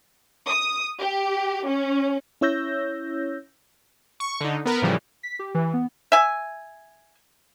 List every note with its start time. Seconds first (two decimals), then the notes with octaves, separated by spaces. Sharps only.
0.48 D#6
0.99 G4
1.66 C#4
2.41 C#4 E4 C#5 E6 G6 A#6
4.20 C#6
4.40 D3 D#4
4.65 B3 A#4 B4
4.82 A2 C#3 E3 F3 G3
5.23 B6
5.39 G4
5.55 E3
5.73 B3
6.12 E5 G#5